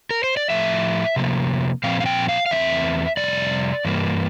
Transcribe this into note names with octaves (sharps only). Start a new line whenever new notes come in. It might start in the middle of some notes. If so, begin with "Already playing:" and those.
A#4
C5
D5
A2 F3 A3 E5
C3 F3 A#3
A#2 F3 C4 F5
F5
G5
F5
F5
E2 E3 A3 C4 E5
F2 C3 G3 D5
G2 E3 A#3